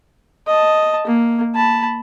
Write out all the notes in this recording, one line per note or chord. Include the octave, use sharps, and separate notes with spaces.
D#5 A5
A#3
A5 B5